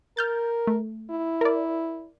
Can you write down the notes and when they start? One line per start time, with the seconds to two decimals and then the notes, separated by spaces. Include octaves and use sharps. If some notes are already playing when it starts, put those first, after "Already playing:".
0.17 A#4 F6 G6 A6
0.67 A3
1.11 E4
1.41 A#4 D5